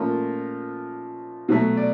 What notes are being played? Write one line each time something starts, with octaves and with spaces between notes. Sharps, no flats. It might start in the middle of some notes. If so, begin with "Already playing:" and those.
Already playing: A#2 F3 A3 C#4 F4 A#4
B2 F#3 A3
D5